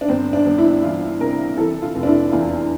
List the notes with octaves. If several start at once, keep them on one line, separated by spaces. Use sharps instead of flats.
D4
G1 C4
D4
G1
E4
E3 F4
C3 A#4
E3 A4
F4
F1
D4
E4
E2 F4